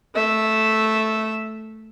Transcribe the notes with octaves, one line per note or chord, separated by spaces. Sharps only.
A3 E5